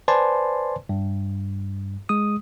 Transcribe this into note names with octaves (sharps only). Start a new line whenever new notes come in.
B4 C5 D5 G#5 A5 C6
G2
G#3 D#6